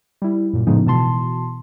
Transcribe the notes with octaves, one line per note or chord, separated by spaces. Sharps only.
G3 E4
F#2 A#2
A2 C#3 F3 G#3 B3 D#4
B2 E3 A5 C6